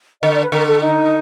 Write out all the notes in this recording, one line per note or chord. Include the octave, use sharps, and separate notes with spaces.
D3 D#5
D5
B4
D3 A#4
A4
D#4